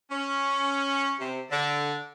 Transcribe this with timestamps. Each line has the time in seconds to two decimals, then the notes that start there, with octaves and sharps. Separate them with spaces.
0.11 C#4
1.20 C3
1.51 D3